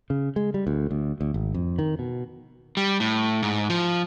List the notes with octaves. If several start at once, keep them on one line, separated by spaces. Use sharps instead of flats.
C#3
G#3
G3
D2
D2
D2
G#1
F2
D#3
B2
G3
A2
G#2
F3